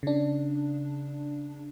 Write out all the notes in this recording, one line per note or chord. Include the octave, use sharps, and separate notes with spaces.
C#3 D4